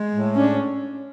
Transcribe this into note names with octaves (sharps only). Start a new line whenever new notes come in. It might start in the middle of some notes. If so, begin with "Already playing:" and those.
Already playing: G#3
A2
C#4 D4